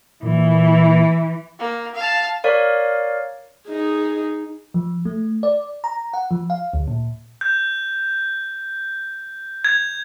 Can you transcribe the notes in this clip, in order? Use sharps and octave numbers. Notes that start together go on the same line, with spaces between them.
A#2 E3
A#3
F5 A5
A#4 C#5 D5 F5
D#4 G#4
F3
A3
D5
A#5
F#5
F3
F5
D2
A#2
G6
G#6